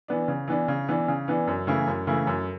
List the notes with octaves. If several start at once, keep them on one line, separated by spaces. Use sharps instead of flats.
E3 B3 D4
C#3
E3 B3 D4
C#3
E3 B3 D4
C#3
E3 B3 D4
F#2
C#3 E3 A3 E4
F#2
C#3 E3 A3 E4
F#2